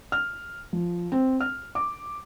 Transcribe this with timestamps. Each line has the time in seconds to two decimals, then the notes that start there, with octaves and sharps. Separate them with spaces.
0.12 F6
0.73 F3
1.12 C4
1.41 F6
1.75 D6